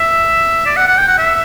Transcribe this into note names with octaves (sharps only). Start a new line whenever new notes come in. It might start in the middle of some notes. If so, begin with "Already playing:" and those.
Already playing: E5
D5
F#5
F#5
G5
F#5
E5